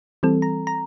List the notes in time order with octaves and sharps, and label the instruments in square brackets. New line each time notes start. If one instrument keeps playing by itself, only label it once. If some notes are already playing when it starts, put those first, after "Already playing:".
[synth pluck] E3 G3 C4 A4
A#5
A#5